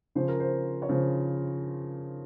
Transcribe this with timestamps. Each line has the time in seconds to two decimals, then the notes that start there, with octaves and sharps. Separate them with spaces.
0.15 C#3 F3 C5
0.28 A#4
0.40 C5
0.82 C#5
0.89 C#3 F3 C5